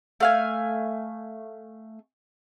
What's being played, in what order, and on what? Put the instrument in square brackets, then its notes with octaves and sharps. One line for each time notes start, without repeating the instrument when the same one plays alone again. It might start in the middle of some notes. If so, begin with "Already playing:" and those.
[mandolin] A3 F5 G#5